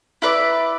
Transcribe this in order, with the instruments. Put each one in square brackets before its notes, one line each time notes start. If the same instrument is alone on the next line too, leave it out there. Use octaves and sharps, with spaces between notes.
[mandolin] E4 B4 D5